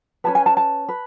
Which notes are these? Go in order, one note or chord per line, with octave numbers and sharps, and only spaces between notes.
C#4 G#4 B4 A5
G#5
A5
A5
B4